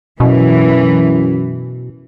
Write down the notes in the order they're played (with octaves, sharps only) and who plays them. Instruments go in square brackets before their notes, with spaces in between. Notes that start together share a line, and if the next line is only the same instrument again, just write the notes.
[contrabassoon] F#2 [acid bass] B2 [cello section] E3